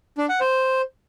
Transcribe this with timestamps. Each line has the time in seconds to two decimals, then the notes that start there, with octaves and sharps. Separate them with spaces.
0.18 D4
0.29 F#5
0.40 C5